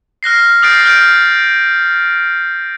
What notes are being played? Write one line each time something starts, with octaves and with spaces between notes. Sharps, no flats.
F6 F#6 A#6 C7
D#6 F6 G6 A6 C7 D7
F6 G6 D7